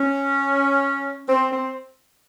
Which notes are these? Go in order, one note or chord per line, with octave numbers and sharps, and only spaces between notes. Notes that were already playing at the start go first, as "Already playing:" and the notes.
Already playing: C#4
C4
C4